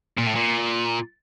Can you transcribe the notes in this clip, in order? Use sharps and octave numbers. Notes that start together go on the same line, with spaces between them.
A#2
A2
A#2